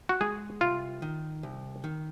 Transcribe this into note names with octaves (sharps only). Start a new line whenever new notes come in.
F#4
G#3 G#4
C2 F4
D#3
C2
D#3